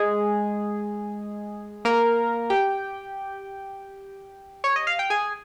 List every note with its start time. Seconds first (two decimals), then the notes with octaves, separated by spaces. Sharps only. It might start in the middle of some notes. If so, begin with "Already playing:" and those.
Already playing: G#3 G#4
1.85 A#3 A#4
2.50 G4 G5
4.64 C#5
4.76 D#5
4.87 F5
4.99 G5
5.10 G#4 G#5